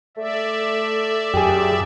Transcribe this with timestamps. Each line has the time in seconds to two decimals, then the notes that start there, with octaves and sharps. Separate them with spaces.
0.17 A3 D5 E5
1.34 F#2 G4 G#4